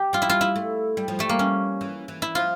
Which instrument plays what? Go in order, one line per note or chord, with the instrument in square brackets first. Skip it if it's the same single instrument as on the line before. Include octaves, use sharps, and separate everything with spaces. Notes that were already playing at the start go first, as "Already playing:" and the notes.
Already playing: [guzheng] G4
[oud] G3 [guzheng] F4
[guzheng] E4
F4
E4
[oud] A3
G3
F3
[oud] G3 [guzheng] A3
[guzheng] A#3
C#4
[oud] E3
E3
[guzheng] E4
[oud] F3 [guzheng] F4